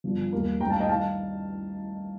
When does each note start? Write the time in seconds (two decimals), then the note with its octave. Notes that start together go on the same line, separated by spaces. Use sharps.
0.04 G1 G2 F3
0.33 D#2 D#3 G3 A#3
0.60 A1 G2 D#3 G5 A#5
0.70 F5 A5
0.80 D#5 G5
0.89 D#3 G3 F5 A5